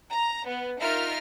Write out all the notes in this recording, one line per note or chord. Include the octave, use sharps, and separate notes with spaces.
A#5
B3
D#4 F4 A#4 E5 F6